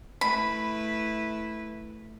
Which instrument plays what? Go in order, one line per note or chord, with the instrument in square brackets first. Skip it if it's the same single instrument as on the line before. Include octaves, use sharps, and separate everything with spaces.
[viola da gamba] A3 E4 B4 [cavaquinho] B5